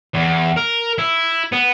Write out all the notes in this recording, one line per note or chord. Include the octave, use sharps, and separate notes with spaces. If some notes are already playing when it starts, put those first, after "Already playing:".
E2
A#4
E4
B3